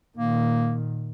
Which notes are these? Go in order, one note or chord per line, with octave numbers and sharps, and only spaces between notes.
A#2 D#3 A#3